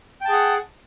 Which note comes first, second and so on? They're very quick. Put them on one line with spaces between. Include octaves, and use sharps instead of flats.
G5 A5 G#4 F#5